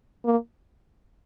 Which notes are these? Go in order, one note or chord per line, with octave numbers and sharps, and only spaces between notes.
A#3